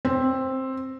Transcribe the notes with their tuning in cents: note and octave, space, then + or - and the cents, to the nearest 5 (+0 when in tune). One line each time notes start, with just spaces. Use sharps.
C4 +10